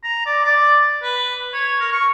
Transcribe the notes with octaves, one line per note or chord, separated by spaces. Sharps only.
A#5
D5
D5
B4
C#5
A#4
C#6